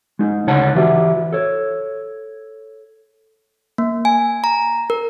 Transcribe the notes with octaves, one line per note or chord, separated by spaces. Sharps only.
G#3 D#4
D2 C#3 D#4 C#5 F#5 A5
E3 F#4 G4 E5
A4 C#5
A#3
G#5
A#5
A#4